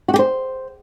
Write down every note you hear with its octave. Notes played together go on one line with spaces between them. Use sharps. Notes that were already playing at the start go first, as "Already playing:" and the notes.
F#4
G4
C5